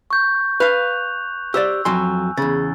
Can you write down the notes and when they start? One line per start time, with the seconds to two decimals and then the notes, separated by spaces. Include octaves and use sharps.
0.11 C#6 G6
0.60 B4 F5 F#6 F7
1.54 G4 C5 D5 E6
1.85 F2 F#3 G#5 C6
2.37 E2 C#3 A6